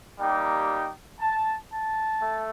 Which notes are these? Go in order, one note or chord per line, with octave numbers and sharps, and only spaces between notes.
G3 A#3 D#4 G4 G5
A5
A5
A3